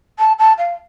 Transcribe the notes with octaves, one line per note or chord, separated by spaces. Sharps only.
A5
A5
F5